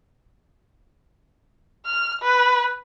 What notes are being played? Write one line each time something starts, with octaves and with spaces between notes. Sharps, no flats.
F6
B4